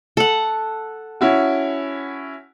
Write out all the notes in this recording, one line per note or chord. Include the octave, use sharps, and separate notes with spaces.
A4 F#5
C#4 E4 F#4